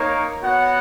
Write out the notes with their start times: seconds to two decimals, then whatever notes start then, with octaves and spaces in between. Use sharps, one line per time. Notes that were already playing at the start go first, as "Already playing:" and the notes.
Already playing: A#3 D#4 A#4 C#5
0.42 B3 F#4 C#5 F#5